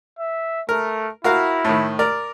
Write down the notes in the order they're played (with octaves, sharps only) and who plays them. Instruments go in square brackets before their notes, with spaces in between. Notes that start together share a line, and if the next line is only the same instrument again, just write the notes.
[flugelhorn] E5
[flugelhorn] A3 [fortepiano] A#4
[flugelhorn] E4 [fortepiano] F#4 A#4 F5
[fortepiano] A2 D#3
A#4 D5